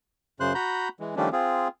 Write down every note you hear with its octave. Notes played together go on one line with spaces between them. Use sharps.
F#2 C#3 C5 C6 F#6
F#4 A#5 B5 G6
E3 G#3
D#3 F3 G3 A3 C#4 D4
C4 F4 G#4